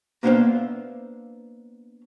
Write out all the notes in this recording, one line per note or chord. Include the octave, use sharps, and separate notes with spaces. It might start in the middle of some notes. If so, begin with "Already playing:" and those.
A#3 B3 D4 C5 E5 F5